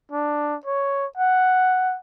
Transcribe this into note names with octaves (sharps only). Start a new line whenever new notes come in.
D4
C#5
F#5